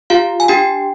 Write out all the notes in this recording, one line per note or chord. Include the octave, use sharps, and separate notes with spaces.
F4 G4 F5
G#5
D4 G4 G5